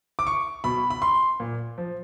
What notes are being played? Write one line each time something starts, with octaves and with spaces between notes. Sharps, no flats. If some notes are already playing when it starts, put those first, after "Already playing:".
D6
C#6
B2 B5
B5
C6
A#2
F3